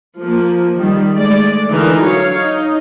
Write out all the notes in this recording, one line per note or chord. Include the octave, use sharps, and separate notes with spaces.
F3 A#3
D#3 G3
G#3 A3 D5
D3 E3 D#4 A#4
F#3 C#5 F5
D#4